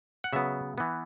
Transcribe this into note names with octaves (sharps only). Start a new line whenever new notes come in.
F#5
C#3 F#3 B3 E5
E3 B3